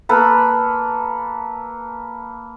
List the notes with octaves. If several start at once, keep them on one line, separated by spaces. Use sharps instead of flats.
A#3 A4 B4